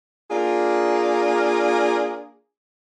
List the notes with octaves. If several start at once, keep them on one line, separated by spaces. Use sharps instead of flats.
A#3 D4 F4 G#4